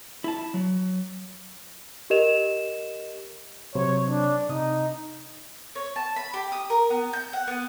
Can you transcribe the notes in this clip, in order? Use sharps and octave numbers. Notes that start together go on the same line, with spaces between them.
E4 A5
F#3
G4 A#4 D#5 E7 F7
C3 F#3 C5 C#5
D4
C3 D#4 D#6
C#5
A5
B5
G4
D#6
A#4
B3
G6
F#5
B3